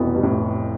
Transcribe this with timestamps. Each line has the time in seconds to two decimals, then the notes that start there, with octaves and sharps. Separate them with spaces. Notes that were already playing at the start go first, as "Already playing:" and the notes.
Already playing: F1 F2 B2 E3 B3
0.15 G2
0.23 A2